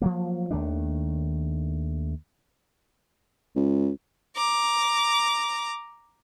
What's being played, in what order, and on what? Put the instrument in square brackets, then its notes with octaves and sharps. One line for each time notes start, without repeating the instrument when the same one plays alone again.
[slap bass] F3 F#3 A#3
D#2 D#3 A3 D4
[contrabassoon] C#2
[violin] A#5 D6